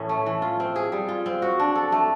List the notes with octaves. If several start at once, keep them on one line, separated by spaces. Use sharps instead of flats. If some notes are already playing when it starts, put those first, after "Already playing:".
Already playing: A2 E3 C#4
A3
E3
F4
C4
G#4
G3
F4
C4
F#4
D4
A4
A3